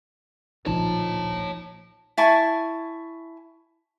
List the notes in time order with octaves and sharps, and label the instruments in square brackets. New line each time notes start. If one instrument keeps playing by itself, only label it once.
[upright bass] D1 A#1 [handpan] F3 D#4 [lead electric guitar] C#5 A5
[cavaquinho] E4 G#5 A5 C#6